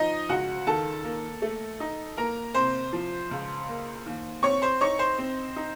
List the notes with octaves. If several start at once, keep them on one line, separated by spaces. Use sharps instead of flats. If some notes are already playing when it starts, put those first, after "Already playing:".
Already playing: F3 D#4 D#5
C#2 F#4 F#5
D#3 A4 A5
A#3
A3
D#4
A#3 A#4 A#5
C3 C5 C6
F3
C#2
A#3
D#2
C4 C#5 C#6
C5 C6
D#4 C#5 C#6
C5 C6
C4
D#4